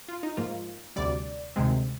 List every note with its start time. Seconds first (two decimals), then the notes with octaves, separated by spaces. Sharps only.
0.08 F4
0.23 D#4
0.37 G#2 F3 A#3 F4
0.96 D2 C3 G3 D5
1.56 D2 C3 D#3 G#3 C4